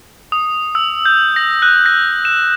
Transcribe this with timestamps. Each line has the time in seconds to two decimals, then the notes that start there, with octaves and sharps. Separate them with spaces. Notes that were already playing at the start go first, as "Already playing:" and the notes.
0.32 D#6
0.75 E6
1.05 G6
1.36 A#6
1.62 F#6
1.86 A#6
2.25 E7